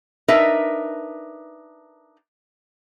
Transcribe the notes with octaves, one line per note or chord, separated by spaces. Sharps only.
D4 D#4 A#4 B4 E5